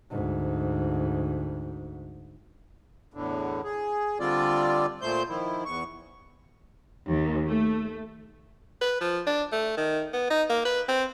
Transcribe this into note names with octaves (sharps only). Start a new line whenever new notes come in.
D2 G#2
E2 A2 D3
G#4
D3 G3 C4 F4 D5
A#2 A3 C5 G6
D#3 F3 E4
E2 C#6
D#2
A3
B4
F3
D4
A3
D#3
B3
D#4
A#3
B4
C4